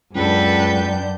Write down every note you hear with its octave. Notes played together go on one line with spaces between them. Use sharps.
C#2 F#2 D4 A4 B4 G5 G6